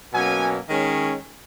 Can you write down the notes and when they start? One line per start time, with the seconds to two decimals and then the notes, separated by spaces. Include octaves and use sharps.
0.13 B2 F#3 A#3 C#4 G#5
0.70 D#3 G#3 C#4